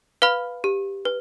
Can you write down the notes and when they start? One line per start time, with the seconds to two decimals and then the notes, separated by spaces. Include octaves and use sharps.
0.22 B4 F5 B5 F6
0.64 G4
1.05 B4